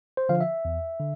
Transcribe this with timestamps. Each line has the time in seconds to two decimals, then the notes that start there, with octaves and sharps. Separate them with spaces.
0.17 C5
0.29 D3 F3 F5
0.41 E5
0.65 E2
1.00 D3